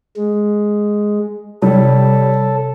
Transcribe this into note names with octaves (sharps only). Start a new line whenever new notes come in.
G#3
C3 G3 A4 C#5